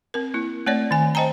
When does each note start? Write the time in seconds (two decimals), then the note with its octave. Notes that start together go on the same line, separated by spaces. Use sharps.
0.14 C4 A#4
0.34 A#3 E4
0.66 A3 C4 C#5 D5
0.91 D#3 G#5
1.15 C5 D#5 G5 A5 A#5